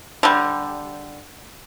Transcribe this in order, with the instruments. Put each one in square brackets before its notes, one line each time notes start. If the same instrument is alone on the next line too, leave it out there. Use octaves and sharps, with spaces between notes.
[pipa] D3 G3